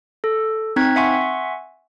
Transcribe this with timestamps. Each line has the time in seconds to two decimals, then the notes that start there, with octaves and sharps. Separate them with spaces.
0.24 A4
0.76 C4 D#4 F#6 G#6 B6
0.96 E5 F#5 G#5 C6 C#6